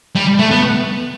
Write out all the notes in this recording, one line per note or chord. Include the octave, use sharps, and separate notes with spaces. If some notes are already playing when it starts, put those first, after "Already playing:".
G3
A3
B3